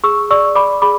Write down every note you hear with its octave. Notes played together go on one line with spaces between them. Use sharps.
G#4 C#6 E6
D5 C#6 E6
D5 B5 D6
G#4 B5 D6